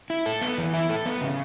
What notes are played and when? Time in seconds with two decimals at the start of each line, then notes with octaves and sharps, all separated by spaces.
0.10 E4
0.26 A4
0.41 B3
0.58 E3
0.74 E4
0.90 A4
1.06 B3
1.21 C#3